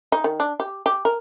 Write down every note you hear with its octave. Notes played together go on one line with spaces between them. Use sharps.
D#4
D#3
D4
G4
G4
A#4